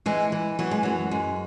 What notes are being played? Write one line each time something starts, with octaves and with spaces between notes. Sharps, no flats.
E3 G#3
E3
E3 F#3
G#3
F#2 F#3
F#2 G#3